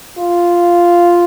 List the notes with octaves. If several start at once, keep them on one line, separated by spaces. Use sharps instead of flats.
F4